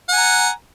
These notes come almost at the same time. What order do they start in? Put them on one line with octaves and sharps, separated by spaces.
F#5 G#5 A#5